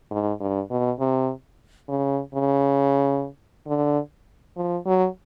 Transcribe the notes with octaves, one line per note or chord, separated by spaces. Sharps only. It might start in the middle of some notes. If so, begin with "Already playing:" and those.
G#2
G2
B2
C3
C#3
C#3
D3
F3
F#3